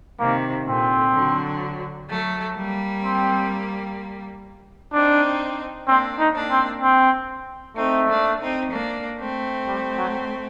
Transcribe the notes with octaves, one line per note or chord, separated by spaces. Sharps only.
C3 D#3 A#3
A#2 D3 C4
D3 F#3
F#3 A3
G3 A#3
C4
C4 D4 D#4
A#3 C4 D4
D#4
A#3 D4
C4
C4
A3 C4 D#4
A#3 D4
C4 D#4
A#3 D4
A3 C4
G3
F#3